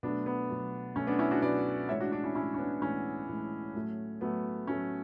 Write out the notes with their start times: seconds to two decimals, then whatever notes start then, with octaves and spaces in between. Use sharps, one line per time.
0.03 B2 F#3 A3 B3 D4
0.26 B3
0.49 B2 F#3 A3
0.96 B2 F#3 A3 C#4
1.07 B3 D4
1.19 C#4 E4
1.31 D4 F#4
1.42 B2 F#3 A3 B4 D5
1.89 A2 E3 G#3 C#5 E5
2.01 D4 F#4
2.12 D4 F#4
2.24 C#4 E4
2.35 A2 E3 G#3 C#4 E4
2.54 C#4
2.58 B3 D4
2.82 A2 E3 G#3 C#4
3.29 A2 E3 G#3
3.74 A2 F#3 A3
4.21 A2 F#3 A3 B3
4.67 A2 F#3 A3 C#4